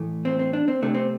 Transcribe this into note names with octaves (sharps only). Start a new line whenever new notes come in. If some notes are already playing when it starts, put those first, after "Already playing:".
Already playing: A2 E3 A3
C4
C4
D4
C4
C3 A3 D4
C4